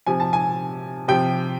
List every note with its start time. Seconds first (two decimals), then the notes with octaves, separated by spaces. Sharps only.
0.06 C3 F3 G#5
0.20 A5
0.33 G#5
1.08 C3 F3 G5